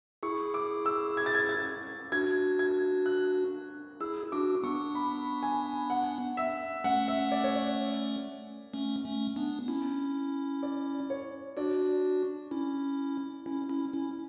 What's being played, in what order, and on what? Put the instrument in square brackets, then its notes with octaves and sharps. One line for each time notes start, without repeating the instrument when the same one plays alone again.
[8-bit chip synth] E4 G#4 [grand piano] C#6
[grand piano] D6
E6
G#6
A6
G#6
A6
[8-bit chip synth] D4 F#4 [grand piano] G#6
[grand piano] G#6
F#6
[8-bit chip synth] E4 G#4 [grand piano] E6
[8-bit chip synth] D4 F#4 [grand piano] D6
[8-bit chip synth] B3 D4 [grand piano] C#6
[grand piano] B5
G#5
F#5
E5
[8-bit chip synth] A3 C#4 [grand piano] F#5
[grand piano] E5
D5
C#5
D5
[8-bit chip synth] A3 C#4
A3 C#4
B3 D4
C#4 E4
[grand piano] D5
C#5
[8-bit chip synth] D4 F#4 [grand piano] D5
[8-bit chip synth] C#4 E4
C#4 E4
C#4 E4
C#4 E4